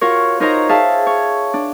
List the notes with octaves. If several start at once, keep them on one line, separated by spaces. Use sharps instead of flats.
F4 F#4 A#4 C#5
D#4 A#4 C5 C#5 D#5 A#5
G#4 E5 F5 A5
C#5
D4